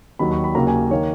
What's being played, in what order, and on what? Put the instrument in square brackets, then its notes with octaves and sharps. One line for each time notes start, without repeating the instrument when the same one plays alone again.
[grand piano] D#2 D#3 F#3 B5
C#6
B5
D#2 C#3 F#3 A#3 A#5
G#5
D#3 A#3 C#5